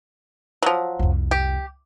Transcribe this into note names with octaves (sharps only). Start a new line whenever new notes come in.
F3 F#3
C2 F2
G4